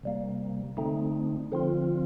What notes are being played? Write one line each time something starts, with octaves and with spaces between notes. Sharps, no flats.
C3 G3 A#3
D3 A3 C4 D#4
D3 F3 C4 F4